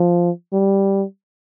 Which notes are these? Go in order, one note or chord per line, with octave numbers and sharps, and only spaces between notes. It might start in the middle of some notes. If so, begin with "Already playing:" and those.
Already playing: F3
G3